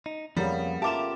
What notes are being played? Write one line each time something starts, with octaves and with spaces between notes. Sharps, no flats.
D#4
F2 C#3 G3 A#3 B3
A3 F4 G4 A#4 A5 D6 E7